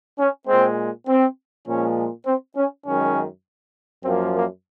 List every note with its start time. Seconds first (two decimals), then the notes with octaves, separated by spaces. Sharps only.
0.18 C#4
0.48 A#2 G#3 C4
1.07 C4
1.67 A#2 F3 G#3 C#4
2.25 C4
2.56 C#4
2.85 F#2 D#3 G#3 C#4
4.04 F#2 F3 A#3 C4
4.34 A#3